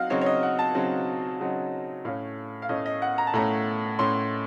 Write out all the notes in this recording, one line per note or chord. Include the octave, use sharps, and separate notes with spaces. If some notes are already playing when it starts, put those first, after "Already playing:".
Already playing: F#3 C4 D#4 F5 F#5
C#3 F#3 C4 D#4 C#5
C#5
D#5
F#5
A5
C#3 F#3 C4 D#4
C#3 F#3 C4 D#4
A2 A3 C#4 F5
F5
A2 A3 C#4 D#5
D#5
F#5
A#5
A5
A2 A3 C#4 A#5
A2 A3 C#4 C6